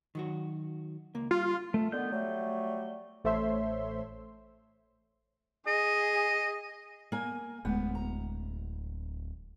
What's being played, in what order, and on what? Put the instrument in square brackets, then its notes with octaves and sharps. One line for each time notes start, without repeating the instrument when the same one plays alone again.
[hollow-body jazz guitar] D#3 F#3 F#4
C#2 A#3
[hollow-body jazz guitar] G3 [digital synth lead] F4
[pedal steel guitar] A3
[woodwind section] D3 D#3 B3 [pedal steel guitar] G6
[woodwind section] F#3 G3 A3
[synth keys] A1 A3 C5 C#5 E5 C6
[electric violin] G#4 [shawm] D#5
[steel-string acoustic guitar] A#3 G#5
[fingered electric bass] D1 [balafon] G#3 A3 [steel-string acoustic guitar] B3
[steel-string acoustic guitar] A#5